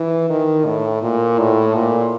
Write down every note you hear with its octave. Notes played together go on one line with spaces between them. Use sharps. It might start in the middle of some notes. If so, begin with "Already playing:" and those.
Already playing: E3
D#3
A2
A#2
A2
A#2